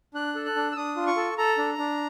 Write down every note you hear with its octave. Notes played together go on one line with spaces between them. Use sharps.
D4 F#6
A4
F#6
D4
E6
D4 D#6
F4
C#6
A4
A4 A#5
D4
D4